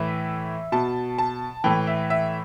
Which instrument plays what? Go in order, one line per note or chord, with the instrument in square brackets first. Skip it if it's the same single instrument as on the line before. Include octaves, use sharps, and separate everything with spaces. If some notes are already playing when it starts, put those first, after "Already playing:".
Already playing: [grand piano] A2 E3 E5
B2 A5
A5
A2 E3 G5
E5
E5